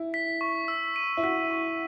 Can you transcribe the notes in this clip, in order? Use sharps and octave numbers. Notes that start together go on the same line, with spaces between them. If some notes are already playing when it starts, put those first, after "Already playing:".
Already playing: E4
B6
C#6
E6
D#7
E4
F#4 B6
C#6